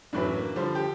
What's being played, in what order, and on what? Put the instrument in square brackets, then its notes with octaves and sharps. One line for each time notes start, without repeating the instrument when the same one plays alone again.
[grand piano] F#2 A2 [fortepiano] E3 F#3 D4
[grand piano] A#3
[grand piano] D3 F3 G3 [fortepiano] C5
[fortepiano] G4